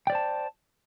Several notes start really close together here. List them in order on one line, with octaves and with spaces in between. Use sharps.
G5 D5 C5 A5